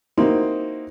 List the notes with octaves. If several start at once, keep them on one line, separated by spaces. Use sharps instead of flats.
A#3 C4 D#4 E4 F#4